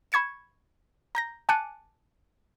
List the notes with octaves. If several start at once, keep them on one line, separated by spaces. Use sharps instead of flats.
B5 C#6 G#6 C#7 E7
A#5 G6 A#6
G#5 A5 D6 F#6 C#7 D#7